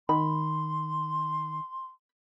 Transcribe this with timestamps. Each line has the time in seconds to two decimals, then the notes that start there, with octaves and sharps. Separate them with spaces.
0.09 D#3 B5 C6